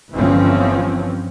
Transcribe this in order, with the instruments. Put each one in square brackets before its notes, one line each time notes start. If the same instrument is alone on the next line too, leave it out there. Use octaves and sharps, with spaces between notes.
[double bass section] G1 E3 F3 C4 C#4